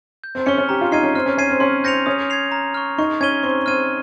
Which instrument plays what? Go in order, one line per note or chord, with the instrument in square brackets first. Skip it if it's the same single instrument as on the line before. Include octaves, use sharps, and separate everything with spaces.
[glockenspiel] G6
[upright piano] C4
[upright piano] C#4 [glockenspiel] C#7 G7
[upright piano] C#4
[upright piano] G4 [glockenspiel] A#5
[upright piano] F4
[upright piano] D#4 [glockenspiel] F6 G#6 C7 D#7
[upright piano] C#4
[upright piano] C4 [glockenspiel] F6
[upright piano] C#4
[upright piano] C#4 [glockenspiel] G#6 C7 D#7
[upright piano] C4
[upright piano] C#4 [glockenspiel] C6
[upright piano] C4 [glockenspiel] G6 A#6 C#7 F7
[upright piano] C#4 [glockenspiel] D#6
[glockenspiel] G#6 C7 F7
A#5
C#6 F6
[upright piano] D#4 [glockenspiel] C#6
[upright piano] C#4 [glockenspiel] G#6 D#7 G7
[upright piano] C4 [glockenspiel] C#6
[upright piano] C4 [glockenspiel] F6 G#6 D#7